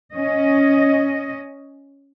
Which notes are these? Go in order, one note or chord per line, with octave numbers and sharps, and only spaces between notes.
C#4 D#5